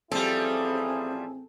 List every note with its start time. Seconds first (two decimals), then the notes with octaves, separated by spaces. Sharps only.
0.12 A1 F3 G3 C4 E4 G#4 A4